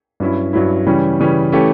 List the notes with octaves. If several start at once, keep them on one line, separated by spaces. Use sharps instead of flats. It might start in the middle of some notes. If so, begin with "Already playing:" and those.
G2 F#3 C#4 E4
G2 F#3 C#4 E4
C#3 E3 G3 C#4
C#3 E3 G3 C#4
E3 A3 C#4 G4